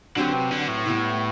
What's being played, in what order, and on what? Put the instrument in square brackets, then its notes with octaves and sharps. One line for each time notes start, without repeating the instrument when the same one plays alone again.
[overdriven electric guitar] D3 [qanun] F#3 C4 G4 B4
[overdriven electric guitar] C3
D3
A2
[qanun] G3 B3 E4